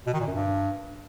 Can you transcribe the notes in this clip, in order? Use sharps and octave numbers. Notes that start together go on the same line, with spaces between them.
B2
D#3
A#2
F#2
G2